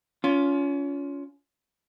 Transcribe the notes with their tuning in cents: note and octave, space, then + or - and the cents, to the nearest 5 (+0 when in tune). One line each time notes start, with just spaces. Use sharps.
C#4 +30 F4 +0